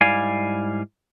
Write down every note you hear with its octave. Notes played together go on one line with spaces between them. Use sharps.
G#2 G3 E4 D5 F5 G#5